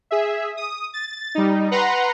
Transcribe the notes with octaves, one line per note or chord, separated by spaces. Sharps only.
G#4 E5
D#6
A6
G3 D#4
B4 F#5 A#5 C6